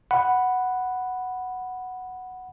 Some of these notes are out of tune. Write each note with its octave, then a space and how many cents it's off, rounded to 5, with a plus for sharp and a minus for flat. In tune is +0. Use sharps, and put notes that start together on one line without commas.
F#5 +0 B5 +0